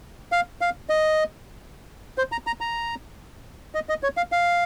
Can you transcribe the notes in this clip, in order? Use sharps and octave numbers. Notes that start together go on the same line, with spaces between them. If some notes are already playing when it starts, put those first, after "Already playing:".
F5
F5
D#5
C5
A#5
A#5
A#5
D#5
D#5
C#5
F5
F5